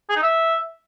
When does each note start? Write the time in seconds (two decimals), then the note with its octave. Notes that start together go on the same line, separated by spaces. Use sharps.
0.09 G#4
0.16 D#4
0.23 E5